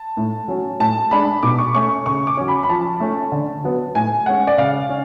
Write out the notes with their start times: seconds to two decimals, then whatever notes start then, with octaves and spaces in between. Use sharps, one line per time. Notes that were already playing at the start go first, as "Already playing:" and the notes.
Already playing: A5
0.17 A2
0.48 F#3 C#4
0.80 A2 A5
1.11 G#3 D4 B5
1.43 B2 D6
1.58 C#6
1.74 A3 C#4 C#6
2.06 C#3 C#6
2.27 D6
2.37 F#3 C#4
2.48 B5
2.63 B5
2.69 F3 A5
3.00 A3 C#4
3.32 D3
3.64 F#3 B3
3.95 A2 G#5
4.26 G#3 C#4 F#5
4.47 D5
4.58 C#3 F5
4.89 C#4